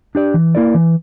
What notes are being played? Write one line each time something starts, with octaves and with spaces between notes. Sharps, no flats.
D4 G4 D5
E3
A#3 E4 A#4 D5
E3